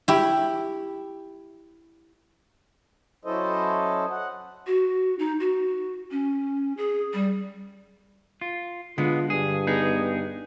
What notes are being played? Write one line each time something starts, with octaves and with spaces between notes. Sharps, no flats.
E4 G4
F#3 C#4 E4 A4 C5 D#5
F#5
F#4
D#4
F#4
C#4
G#4
G3
F4
D3 G#3 B3 F4
G2 G#4
B3 D#4 G#4